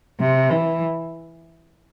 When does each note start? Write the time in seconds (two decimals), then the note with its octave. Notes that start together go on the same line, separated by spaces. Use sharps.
0.20 C3
0.51 E3